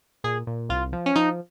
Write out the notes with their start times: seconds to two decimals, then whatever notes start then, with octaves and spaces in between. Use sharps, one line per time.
0.24 A#2 G#4
0.47 A#2
0.69 C2 F4
0.93 F3
1.06 C#4
1.16 F3 D#4